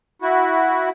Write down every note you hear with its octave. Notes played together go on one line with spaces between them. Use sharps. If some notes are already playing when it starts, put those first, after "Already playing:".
E4 F#4